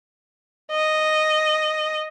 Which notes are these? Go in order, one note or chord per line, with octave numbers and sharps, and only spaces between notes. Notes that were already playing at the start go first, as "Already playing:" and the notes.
D#5